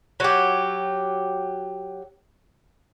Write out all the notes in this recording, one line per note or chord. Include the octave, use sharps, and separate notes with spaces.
F#3 G4